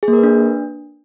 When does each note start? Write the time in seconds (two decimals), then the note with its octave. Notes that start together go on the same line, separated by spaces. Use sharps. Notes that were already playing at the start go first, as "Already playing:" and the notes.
0.03 G#4
0.08 A#3
0.13 A#4
0.18 B4
0.23 D4